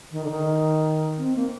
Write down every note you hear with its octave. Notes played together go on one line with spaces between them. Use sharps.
D#3
D3
D#3
C4
A#3